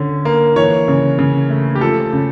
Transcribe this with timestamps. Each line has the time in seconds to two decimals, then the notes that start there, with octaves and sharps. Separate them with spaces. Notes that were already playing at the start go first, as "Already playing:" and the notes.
Already playing: D3 C#4
0.25 A#3
0.56 E3 C#5
0.88 C#3
1.19 C#3
1.50 A3
1.75 G4
1.81 F3 A4
2.13 C#3